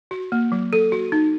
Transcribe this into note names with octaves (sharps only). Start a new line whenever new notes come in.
F#4
A#3
F#3
A4
F#4
D#4